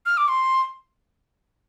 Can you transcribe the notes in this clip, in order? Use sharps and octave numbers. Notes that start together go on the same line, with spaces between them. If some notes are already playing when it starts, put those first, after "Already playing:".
F6
D6
C6